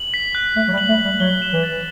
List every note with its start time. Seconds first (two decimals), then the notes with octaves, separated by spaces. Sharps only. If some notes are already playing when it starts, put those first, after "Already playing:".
Already playing: F#7
0.14 B6
0.35 F#6
0.56 A3 F#6
0.68 F#3
0.72 G3
0.78 F#7
0.89 A3
0.99 B6
1.04 G3
1.20 F#3 G7
1.42 E7
1.53 E3
1.63 A6